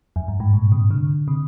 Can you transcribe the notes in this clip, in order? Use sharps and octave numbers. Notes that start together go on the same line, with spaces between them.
F2
G2
G#2
A#2
C3
D3
C3